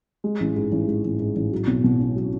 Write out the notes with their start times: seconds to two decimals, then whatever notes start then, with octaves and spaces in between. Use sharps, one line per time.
0.24 G#3
0.40 A1
0.56 G#2
0.72 A1
0.87 G#3
1.04 A1
1.20 G#2
1.36 A1
1.52 F#3
1.67 B1
1.84 B2
2.00 C#4
2.16 F#3